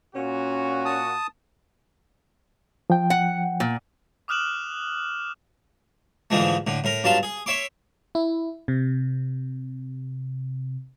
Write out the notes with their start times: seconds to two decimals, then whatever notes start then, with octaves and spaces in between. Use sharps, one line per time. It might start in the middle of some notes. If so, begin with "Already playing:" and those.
0.15 A#2 C#4 F#4
0.85 A5 D#6
2.90 F3 G5
3.10 F#5
3.60 A#2
4.28 D6 D#6 F6 F#6 E7 F#7
6.30 G#2 D3 E3 F3 G#3 A3
6.67 A2 D3
6.84 A2 A#4
7.04 G2 F#3 F4 A5 C6
7.23 G#4
7.46 C#5 E5 C6 D6
8.15 E4
8.68 C3